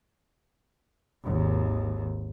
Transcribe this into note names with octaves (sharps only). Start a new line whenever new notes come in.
G#1 D#2